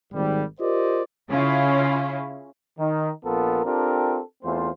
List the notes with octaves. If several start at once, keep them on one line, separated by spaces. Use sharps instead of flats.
G#1 G3
F4 G4 A#4 C5 D5 D#5
C#3 C#4 E4 F4
D#3 D#4
A#1 B3 F4 A4 A#4
C4 D4 F4 G4 A4 A#4
E2 A3 C4 F4 C5